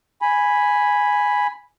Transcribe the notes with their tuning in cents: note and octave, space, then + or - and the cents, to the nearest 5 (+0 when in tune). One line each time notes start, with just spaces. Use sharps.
G#5 +0 B5 +0